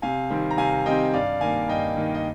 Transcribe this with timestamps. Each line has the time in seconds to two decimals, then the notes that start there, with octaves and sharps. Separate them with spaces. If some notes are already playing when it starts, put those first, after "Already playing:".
0.02 C3 F5 G#5
0.30 D#3 G3 C4
0.51 A#5
0.57 C3 F5 G#5
0.86 D#3 G3 C4 D#5 G5
1.13 G2 D5 F5
1.41 D#3 A#3 F5 G#5
1.68 G2 D#5 G5
1.97 D#3 A#3
2.14 D#5